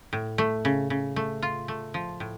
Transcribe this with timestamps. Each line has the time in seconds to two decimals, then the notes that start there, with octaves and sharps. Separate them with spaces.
0.13 A2
0.38 A3
0.65 C#3
0.90 C#3
1.16 A3
1.42 F4
1.68 A3
1.94 F3
2.20 A2